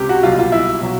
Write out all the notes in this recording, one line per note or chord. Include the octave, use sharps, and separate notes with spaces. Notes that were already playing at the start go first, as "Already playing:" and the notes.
Already playing: C#2 C3 G4
F#4
B1 A#2 G3 F4
F4
E4
B2 F#3